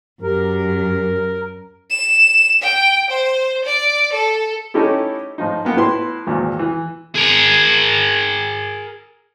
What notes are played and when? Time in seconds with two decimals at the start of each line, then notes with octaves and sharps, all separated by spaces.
0.22 F#2 G4 A#4
1.90 E7
2.62 G5
3.11 C5
3.65 D5
4.13 A4
4.74 A3 C#4 D#4 E4 G4 A4
5.38 A2 F3 D#4
5.65 A#3 B3 G5
5.77 A2 E4 B4 C6
6.27 G#1 E2 A#2
6.59 E3
7.16 G#4 A#4